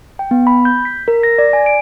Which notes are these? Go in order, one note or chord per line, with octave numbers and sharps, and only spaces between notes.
G5
B3
B5
G6
B6
A#4
A#6
D5
G#5
D7